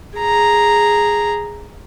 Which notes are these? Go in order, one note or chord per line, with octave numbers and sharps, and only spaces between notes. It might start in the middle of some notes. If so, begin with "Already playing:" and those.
G#4 A#5